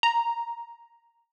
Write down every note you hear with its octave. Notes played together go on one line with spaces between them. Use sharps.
A#5